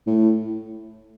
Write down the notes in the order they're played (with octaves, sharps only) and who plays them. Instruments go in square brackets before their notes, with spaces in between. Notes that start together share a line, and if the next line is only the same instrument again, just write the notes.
[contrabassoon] A2